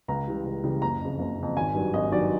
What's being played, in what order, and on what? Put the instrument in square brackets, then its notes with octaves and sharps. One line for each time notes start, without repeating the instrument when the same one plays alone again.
[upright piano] C#2 A#5
C#3 E3 G3
C#2
C#3 E3 G3
F#1 A#5
F2 C#3
F#1
F2 C#3
G#1 G#5
G2 D#3 F#3
G#1 D#5
G2 D#3 F#3 D5